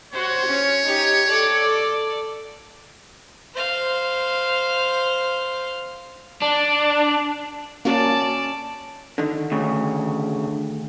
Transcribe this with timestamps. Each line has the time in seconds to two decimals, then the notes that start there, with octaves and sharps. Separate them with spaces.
0.12 F#4 C5 C#5
0.46 C#4
0.86 D#4 G4
1.28 A4 D5
3.54 C5 F5
6.42 D4
7.85 A#3 C#4 F#4 D5 A5
9.18 D3 D#3
9.52 D2 C#3